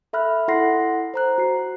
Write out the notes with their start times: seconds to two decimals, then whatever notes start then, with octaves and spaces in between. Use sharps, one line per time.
0.13 A4 E5 B5 F6 F#6
0.48 E4 A4 F#5 C6 A#6 C7
1.14 C5 A#5 F#6
1.38 F#4 C7